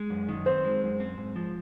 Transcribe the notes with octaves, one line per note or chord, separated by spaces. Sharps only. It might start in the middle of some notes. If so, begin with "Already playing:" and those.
Already playing: G#3
F#2
D#3
C4 C5
G#3
F#2
C4
G#2
F3